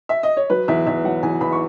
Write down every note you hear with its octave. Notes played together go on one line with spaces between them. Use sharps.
E5
D#5
C#5
F#3 B4
E2 E5
E2 E5
F#3 F#5
E2 G#5
E2 B5
C#6